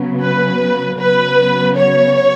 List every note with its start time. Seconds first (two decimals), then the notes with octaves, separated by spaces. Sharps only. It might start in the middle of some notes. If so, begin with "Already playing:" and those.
Already playing: C#3 F#3 B3
0.22 B4
0.98 C#3 F#3 B3 B4
1.76 C#5